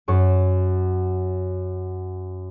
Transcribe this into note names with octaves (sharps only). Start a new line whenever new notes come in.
F#2 C#6